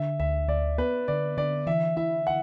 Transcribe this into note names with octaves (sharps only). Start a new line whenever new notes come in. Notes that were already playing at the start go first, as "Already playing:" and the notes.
Already playing: D3 E5
D2 E5
D2 D5
B3 B4
D3 D5
D3 D5
E3 E5
E4 E5
F#5